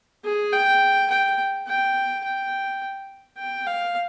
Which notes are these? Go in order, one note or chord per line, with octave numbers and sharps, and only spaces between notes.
G#4
G5
G5
G5
G5
G5
F5